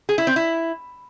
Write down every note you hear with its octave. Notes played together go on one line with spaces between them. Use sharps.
G#4
E4
C4
E4